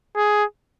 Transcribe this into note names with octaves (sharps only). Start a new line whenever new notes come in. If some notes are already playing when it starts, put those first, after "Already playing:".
G#4